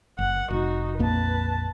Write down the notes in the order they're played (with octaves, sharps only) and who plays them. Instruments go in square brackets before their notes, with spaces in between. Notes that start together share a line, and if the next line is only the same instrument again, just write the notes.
[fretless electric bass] F#1 [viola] F#5
[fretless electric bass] F1 [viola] D#4 F#4
[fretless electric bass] A#1 F2 A#3 [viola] B4 A5